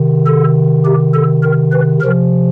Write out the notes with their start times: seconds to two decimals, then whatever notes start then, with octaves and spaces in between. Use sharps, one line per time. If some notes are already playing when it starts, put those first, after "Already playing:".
Already playing: C3 D#3
0.26 A4
0.85 G4
1.14 A4
1.43 A#4
1.72 B4
2.01 C3 F3 A#4